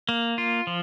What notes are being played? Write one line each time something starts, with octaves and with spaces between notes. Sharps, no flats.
A#3
F4
F3